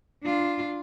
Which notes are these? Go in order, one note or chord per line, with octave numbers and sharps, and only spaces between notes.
D4 F4